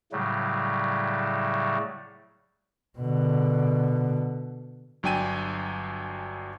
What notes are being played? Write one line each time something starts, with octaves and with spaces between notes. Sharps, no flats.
A2 C#3 F#3 G3 A3
B2 D3
G1 F#3 D4 G5 G#5 D#7